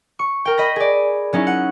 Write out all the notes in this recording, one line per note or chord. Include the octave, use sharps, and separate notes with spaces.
C#6
A#4 G5
D#5 B5 A#6
G#4 D5
F#3 C#4 D#4 E4
F#5